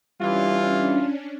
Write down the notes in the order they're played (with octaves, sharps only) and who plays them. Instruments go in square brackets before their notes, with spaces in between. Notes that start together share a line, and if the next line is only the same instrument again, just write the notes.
[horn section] E3 F4 [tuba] G3 [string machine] C#4 D4